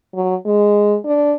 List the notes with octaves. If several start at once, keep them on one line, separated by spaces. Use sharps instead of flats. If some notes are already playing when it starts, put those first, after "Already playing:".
F#3
G#3
D4